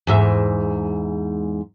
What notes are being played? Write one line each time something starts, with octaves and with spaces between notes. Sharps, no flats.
E2 G#2 E5